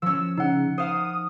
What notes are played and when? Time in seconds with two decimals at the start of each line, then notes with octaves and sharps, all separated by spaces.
0.02 F3 C#4 E6
0.38 C#3 D#4 F#5
0.78 C5 F5 D#6